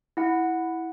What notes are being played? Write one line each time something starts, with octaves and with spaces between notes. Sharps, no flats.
E4 F#5